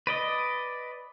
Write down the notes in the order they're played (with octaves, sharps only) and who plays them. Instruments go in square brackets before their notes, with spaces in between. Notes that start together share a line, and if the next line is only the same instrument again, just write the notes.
[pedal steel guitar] B4 D5 D#5